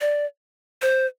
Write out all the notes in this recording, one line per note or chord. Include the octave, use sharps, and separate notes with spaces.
D5
C5